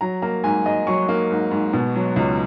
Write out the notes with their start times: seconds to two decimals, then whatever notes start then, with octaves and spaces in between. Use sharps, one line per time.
0.01 F#3 A#5
0.22 A#3 A#5
0.44 G#2 G#5
0.66 G#2 D#5
0.87 F#3 C#6
1.09 A#3
1.31 G#2
1.51 G#2
1.73 B2
1.96 F#3
2.16 C#2